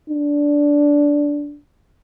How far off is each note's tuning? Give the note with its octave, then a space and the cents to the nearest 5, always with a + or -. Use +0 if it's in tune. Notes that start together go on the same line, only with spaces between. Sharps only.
D4 -10